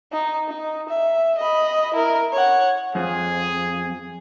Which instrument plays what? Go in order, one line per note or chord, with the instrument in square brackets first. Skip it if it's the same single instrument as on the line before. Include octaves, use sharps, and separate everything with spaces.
[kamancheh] D#4
D#4
E5
D#5 B5
E4 A#4
C#5 F#5
[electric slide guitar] F2 [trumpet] G#4